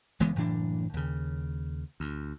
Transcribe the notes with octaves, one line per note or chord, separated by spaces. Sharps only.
F#1 E3 G#3 B3
F#1 A2 E3 D4
D#2 C#3
D2